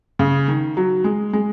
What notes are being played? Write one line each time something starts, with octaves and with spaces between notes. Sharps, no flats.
C#3
D#3
F#3
G#3
G#3